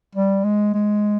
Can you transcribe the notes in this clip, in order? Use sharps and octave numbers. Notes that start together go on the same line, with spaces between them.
G3
G#3
G#3